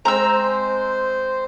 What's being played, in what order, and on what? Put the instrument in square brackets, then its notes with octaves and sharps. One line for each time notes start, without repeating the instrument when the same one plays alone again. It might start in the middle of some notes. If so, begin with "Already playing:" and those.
[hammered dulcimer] G#3 C4 [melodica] C5 [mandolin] A#5 E6